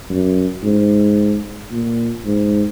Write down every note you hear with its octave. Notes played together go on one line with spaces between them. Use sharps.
F#2
G#2
A#2
G#2